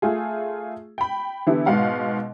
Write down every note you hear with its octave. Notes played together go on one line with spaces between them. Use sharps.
A3 F4 G#4
G5 B5
D3 E3 B3 E4 G4
G#2 B2 F5 F#5